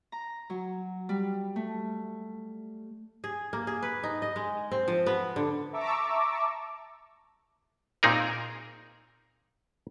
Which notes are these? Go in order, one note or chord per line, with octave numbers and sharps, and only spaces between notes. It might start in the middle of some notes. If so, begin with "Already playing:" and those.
A#5
F#3
G3
A3
G#4
A#3
G#4
B4
D#4
D#5
G#3
C4
F3
B3
D3
E5 A5 A#5 C#6 D6 E6
A#2 C4 D#4 G#4 A#4